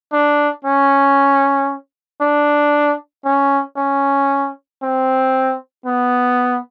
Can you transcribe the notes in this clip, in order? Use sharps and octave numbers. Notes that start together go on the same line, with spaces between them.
D4
C#4
D4
C#4
C#4
C4
B3